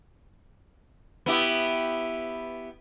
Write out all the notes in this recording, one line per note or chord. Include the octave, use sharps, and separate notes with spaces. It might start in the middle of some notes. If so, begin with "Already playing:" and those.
B3 E4 G4